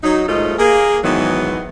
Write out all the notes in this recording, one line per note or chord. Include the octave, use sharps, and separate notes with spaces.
F#3 D#4
D#2 G#2 A3 F4 D#5
A#3 G#4
G#2 D#3 E3 F#3 B3